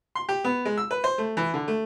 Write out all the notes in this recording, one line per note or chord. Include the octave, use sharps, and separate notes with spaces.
C6
G4
B3
G#3
E6
B4
C5
A3
E3
D3
A3